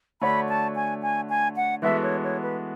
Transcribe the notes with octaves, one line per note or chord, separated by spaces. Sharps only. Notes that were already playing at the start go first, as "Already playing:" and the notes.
D3 A3 D4 F#4 C#5 B5
A5
G#5
G#5
G#5
F#5
E3 G#3 B3 F#4 A4 E5
C#5
C#5
B4